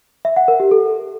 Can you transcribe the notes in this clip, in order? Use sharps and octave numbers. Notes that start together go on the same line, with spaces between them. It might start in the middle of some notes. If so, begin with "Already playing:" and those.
E5
F#5
A#4
G4
A4